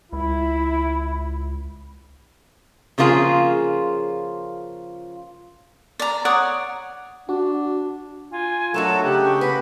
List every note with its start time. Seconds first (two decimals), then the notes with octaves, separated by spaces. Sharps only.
0.13 C#2 E4 B5
2.98 C#3 F3 A#3 F4 G#4
5.99 D5 A#5
6.25 C#5 D5 F#5 D#6
7.29 D4 F#4
8.32 F4 G#5
8.74 F#3 A3 D4 D#4 F#4 A4 A#4 E7
9.04 C#3 G4 F#6
9.24 G5 C#6
9.41 A#3 B4 F#5 B6